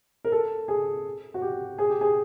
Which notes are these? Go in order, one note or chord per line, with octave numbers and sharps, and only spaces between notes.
A#4
A4
G#4
F#4
G4
G#4
G4
G#4